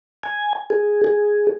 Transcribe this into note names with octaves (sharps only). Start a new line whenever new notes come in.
G#5
G#4
G#4